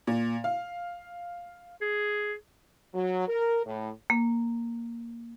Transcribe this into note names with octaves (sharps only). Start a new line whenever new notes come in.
A#2
F5
G#4
F#3
A#4
A2
A#3